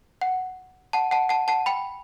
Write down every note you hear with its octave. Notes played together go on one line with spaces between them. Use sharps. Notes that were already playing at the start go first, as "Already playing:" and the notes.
F#5
F#5 A5
F#5 A5
F#5 A5
F#5 A5
G5 B5